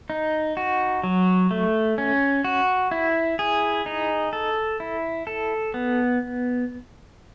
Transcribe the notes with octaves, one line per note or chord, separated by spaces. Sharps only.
D#4
F#4
F#3
A3
C#4
F#4
E4
G#4
D#4
A4
E4
A4
B3